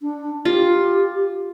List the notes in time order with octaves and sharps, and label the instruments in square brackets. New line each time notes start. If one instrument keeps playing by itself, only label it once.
[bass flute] D4
[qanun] F4 [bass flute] G4